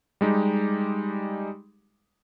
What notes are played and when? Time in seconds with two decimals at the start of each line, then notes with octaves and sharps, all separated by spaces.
0.21 G3 G#3 D#4 G4